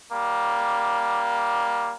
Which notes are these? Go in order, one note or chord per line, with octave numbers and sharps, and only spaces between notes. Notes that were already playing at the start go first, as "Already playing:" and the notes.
G3 A#3